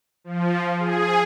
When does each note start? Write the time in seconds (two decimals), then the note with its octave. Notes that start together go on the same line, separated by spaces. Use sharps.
0.24 F3
0.79 G#4